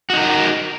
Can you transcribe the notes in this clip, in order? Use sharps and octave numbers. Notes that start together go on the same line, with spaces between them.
D#4 F#4 A#4